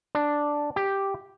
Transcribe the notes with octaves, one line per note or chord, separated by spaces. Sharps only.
D4
G4